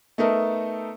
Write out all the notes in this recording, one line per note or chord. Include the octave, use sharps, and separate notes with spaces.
A3 B3 D#4 A4 A#4